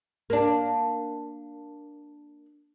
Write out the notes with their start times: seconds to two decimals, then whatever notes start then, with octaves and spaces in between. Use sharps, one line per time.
0.30 A#3 D4